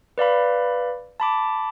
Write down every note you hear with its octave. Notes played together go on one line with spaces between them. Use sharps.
B4 D5 F5 B5
A5 B5 D6